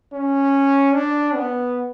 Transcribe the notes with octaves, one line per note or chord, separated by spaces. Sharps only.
C#4
D4
B3